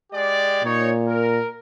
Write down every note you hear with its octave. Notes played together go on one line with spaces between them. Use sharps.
G#3 G4 D5
A#2 D#4 C#5
A#4